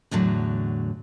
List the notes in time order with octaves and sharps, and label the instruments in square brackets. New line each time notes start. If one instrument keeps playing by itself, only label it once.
[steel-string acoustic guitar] E2 A2 D3 F#3